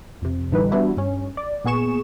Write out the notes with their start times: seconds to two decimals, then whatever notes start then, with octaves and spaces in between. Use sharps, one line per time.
0.22 F2 C3
0.52 A1 D3 E3 G3 D#4 B4
0.71 E3 G3 B3 D4 E4 F#4
0.97 G2 C#4
1.37 D5
1.65 A#2 B3 G#4 C#6 E7